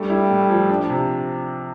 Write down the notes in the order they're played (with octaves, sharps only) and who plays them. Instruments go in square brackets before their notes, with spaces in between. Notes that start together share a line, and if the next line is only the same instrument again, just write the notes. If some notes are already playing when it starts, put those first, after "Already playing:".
Already playing: [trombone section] G3 [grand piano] A3 D4
[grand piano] E4
A2
F3
D4
C3